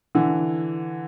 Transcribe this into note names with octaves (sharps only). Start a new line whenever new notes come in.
D3 E3